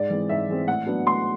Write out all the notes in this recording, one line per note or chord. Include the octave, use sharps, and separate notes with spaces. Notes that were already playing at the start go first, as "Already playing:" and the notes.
Already playing: G#2 D5
E3 G#3 C4
G#2 E5
E3 G#3 C4
A2 F#5
F#3 B3 D4
A2 C6